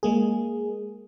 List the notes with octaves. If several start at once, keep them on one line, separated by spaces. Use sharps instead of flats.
G#3 A#3 G#4